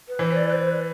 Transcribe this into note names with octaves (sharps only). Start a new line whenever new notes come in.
B4
E3 C5
D5
B4
C5
B4